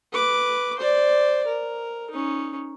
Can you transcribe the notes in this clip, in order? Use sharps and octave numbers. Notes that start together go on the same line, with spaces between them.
B4 D6
C5 D5
A#4
C#4 D#4